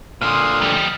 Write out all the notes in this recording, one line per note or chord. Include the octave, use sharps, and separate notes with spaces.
A#2 D3 C6 D#6 F6
F3 G3 D#5